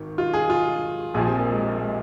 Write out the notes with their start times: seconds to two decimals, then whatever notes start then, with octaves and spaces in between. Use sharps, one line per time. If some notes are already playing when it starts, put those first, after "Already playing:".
Already playing: G#1 G#2 D#3
0.18 F4
0.34 G#4
0.50 F4
1.14 A#1 A#2 F3 G#4
1.27 C4
1.39 A#3
1.51 G#3
1.62 A#3
1.78 G#3